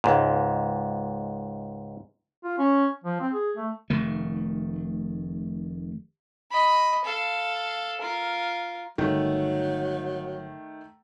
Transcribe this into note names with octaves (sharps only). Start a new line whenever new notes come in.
C#2 G#2
F4
C#4
F3
C4
G#4
A3
F1 D#3 A3
D#5 B5
A4 F5
F4 A#4
G1 D#3 F#3 A3